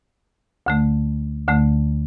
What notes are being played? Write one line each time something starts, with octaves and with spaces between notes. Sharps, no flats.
D2 D3 A3
D2 D3 A3